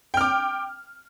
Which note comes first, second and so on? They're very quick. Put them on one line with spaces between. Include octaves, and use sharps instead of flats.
G5 F6 D6